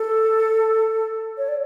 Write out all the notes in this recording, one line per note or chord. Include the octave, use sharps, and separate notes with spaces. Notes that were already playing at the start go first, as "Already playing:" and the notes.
Already playing: A4
C#5
D5